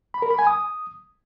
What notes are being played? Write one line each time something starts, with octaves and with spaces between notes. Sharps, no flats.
B5
A#4
B5
G#5
D#6